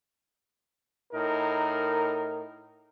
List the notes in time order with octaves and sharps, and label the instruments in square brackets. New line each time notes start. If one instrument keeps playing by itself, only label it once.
[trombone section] A2 D#4 A#4